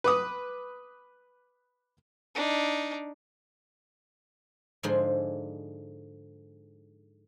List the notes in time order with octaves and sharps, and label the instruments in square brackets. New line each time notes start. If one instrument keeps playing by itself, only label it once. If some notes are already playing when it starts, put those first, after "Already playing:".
[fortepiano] B4 D6 D#6
[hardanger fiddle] D4 D#4
[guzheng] G#2 D3 F3 G#3 G#4 C5